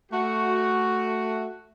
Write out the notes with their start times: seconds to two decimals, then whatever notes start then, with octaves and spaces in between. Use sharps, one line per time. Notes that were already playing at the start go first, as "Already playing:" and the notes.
0.12 A3 F#4